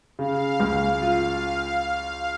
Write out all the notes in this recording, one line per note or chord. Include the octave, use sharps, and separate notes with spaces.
C#3 F5
C#2
F4